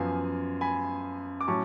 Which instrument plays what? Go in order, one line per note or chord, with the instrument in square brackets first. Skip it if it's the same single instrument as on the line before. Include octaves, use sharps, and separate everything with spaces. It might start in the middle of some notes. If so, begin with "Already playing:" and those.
Already playing: [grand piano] F#2 F3 B3 F5 G#5
G#5 B5
D6
A2 F#3 C#4 A5 C#6